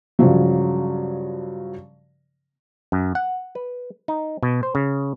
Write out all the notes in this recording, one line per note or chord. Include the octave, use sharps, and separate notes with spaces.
G2 C#3 F3 F#3
F#2
F#5
B4
D#4
B2
C5
C#3